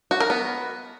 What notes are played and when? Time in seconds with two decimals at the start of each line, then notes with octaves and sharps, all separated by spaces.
0.11 F#4
0.20 A#4
0.30 B3